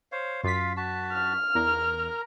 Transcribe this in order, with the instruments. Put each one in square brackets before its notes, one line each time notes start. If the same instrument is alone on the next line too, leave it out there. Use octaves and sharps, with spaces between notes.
[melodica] C5 C#5 F5
[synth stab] F#2 B6 [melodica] F4 F5
[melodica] F#4 A5
[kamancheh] F6
[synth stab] E2 [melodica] A#4 A#5